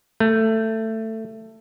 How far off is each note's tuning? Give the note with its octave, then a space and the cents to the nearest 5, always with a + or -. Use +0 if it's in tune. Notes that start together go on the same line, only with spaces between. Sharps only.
A3 +15